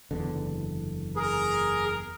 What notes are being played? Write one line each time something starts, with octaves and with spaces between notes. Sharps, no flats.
F#1 E2 D3
G#4 A#4